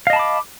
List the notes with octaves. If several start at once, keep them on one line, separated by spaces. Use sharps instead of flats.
D#5 F5 A5 B5 D6